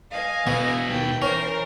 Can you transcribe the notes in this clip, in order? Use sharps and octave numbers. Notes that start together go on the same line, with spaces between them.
D#5 F5 G#5
B2 B3 E4
D#2 G5
E3 C#4 A#4 C5